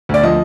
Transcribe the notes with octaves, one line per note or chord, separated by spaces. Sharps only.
D2 D5
F3 D#5